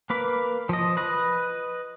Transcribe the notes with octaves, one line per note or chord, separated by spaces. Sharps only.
A#3 B4 D6
F3 D#5
B4 D#5